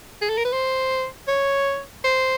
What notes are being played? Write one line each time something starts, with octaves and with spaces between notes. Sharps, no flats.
G#4
A4
A#4
B4
C5
C#5
C5